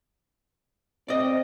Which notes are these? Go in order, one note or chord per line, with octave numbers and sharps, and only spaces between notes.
C4 D5 D#5